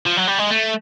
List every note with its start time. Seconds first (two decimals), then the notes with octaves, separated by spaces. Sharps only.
0.06 F3
0.17 F#3
0.27 G3
0.39 G#3
0.51 A3